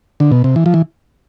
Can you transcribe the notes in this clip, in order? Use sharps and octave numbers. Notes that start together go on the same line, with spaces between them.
D3
B2
C3
E3
F3
E3